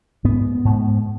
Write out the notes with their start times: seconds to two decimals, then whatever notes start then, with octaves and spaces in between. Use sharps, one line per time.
0.24 G#2 B3
0.65 G#2